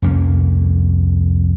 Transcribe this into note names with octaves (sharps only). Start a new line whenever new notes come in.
C2 F2 A#3 C#4